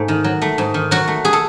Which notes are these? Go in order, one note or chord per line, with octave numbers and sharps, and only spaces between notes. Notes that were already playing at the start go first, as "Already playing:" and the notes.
Already playing: G#2 A3
D#3
F#3
A3
G#2
D#3
F#3 F#4
A3
G#4
A4